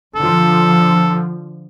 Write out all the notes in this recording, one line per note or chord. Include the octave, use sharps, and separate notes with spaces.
D3 F3 A4